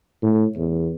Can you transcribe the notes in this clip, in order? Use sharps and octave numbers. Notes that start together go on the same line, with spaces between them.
A2
E2